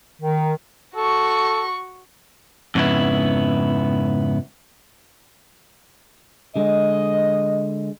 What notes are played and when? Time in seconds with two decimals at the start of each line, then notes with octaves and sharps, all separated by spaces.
0.22 D#3
0.96 F#4 A4 C#6
2.75 F2 G#2 C#3 B3 E4
6.56 D3 G#3 D#5